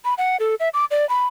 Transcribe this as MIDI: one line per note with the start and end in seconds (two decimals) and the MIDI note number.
0.05 0.14 83
0.18 0.37 78
0.40 0.55 69
0.60 0.69 76
0.74 0.85 86
0.91 1.08 74
1.09 1.27 83